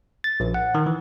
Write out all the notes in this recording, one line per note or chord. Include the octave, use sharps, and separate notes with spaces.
A6
A#1
F#5
D#3
E3